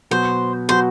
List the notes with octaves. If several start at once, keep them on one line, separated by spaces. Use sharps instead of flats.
B2 F#3 B3 F#4 C5
B2 F#3 B3 F#4 C5